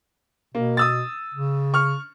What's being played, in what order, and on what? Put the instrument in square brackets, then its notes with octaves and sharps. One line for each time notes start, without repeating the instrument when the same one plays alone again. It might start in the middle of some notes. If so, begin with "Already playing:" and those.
[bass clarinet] B2 [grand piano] A#3
[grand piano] D#6 E6 A6
[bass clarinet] C#3
[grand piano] C#6 F6